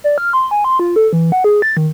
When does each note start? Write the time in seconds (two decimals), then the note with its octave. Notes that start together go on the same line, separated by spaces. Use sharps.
0.04 D5
0.18 F6
0.33 C6
0.51 G#5
0.64 C6
0.79 F4
0.96 A4
1.13 E3
1.32 F#5
1.44 G#4
1.62 A6
1.77 D#3